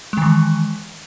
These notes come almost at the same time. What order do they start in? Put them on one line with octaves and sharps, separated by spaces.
G#3 D#3 E3